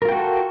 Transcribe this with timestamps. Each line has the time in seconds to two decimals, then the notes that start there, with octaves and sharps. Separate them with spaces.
0.02 A#4
0.05 F4
0.09 G5
0.12 F#4
0.15 A4